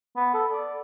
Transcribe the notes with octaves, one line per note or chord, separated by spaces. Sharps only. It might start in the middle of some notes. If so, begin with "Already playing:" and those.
B3
A4
D5